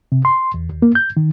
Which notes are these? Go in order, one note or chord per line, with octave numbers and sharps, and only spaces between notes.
C3
C6
E2
D#2
A#3
G6
D#3